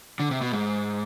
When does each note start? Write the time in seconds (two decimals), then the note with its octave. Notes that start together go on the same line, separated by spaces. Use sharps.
0.20 D3
0.31 C3
0.41 B2
0.52 G#2